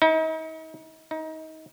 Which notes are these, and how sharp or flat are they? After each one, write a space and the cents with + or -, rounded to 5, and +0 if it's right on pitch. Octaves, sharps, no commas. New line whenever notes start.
D#4 +40
D#4 +25